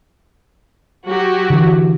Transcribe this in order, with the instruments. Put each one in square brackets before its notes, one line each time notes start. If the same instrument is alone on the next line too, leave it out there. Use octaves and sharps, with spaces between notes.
[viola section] F#3 F#4 G4
[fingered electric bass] D3 E3